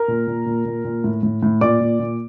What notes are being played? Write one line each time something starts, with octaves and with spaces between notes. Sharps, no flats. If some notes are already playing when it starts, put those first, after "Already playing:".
Already playing: A#4 A#5
A#2
A#2
A#2
A#2
A#2
A2
A2
A2
A#2 D5 D6
A#2
A#2